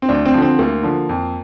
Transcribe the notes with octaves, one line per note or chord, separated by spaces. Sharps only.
C4
D2 D4
C4
D3 F3
C4
D2 A#3
D3 F3
F2